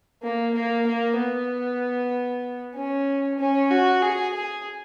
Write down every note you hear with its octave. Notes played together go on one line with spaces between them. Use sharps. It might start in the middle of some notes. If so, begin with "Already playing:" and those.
A#3
A#3
A#3
B3
C#4
C#4
F#4
G#4
G#4